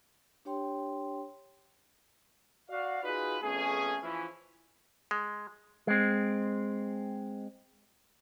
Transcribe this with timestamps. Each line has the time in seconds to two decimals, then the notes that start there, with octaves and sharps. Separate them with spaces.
0.45 D4 G4 C#5 G5 C6
2.70 F#4 D5 F5
3.04 D#4 F4 F#4 G#4 B4
3.43 F2 A3 B3 C#4 G#4
4.03 E3 F3 C#4 E4
5.11 G#3
5.87 G#3 C4